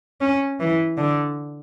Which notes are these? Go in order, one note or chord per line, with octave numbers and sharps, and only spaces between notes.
C#4
E3
D3